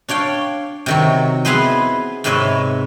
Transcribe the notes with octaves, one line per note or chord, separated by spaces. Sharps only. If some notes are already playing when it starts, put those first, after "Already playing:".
D4 C#5 F5 G5
C3 D#3 F#3
B3 E4 G#4 B4 C5 D#5
G#2 C3 B4 C#5 D#5 E5